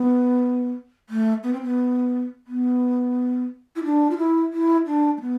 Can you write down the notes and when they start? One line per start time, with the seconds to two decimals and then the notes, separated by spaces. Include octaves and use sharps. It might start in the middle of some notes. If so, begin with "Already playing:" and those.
Already playing: B3
1.10 A3
1.43 B3
1.53 C4
1.63 B3
2.47 B3
3.76 E4
3.84 D4
4.10 F4
4.18 E4
4.53 E4
4.86 D4
5.17 A3
5.21 B3